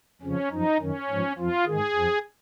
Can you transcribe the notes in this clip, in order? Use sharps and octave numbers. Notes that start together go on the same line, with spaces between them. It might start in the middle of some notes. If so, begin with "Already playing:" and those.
F2 C#3 F3 C#4
F#2 F3 D#4
F#2 D#3 C#4
G#2 F3
F2 F3 F4
G#2 D#3 G#4
F2 F3